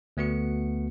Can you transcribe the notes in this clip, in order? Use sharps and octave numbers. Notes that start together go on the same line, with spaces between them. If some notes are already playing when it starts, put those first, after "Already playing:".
D2 A3 B3 F#4 C#7